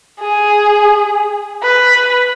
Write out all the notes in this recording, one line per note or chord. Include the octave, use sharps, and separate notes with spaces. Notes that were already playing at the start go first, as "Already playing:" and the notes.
G#4
B4